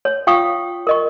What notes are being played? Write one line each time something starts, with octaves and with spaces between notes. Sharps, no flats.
C#5
F4 F5 G5 C#6 D#6
A#4 D#5 C#6